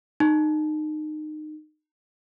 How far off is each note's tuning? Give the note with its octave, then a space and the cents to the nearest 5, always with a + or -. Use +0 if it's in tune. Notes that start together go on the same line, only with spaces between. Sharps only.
D#4 -25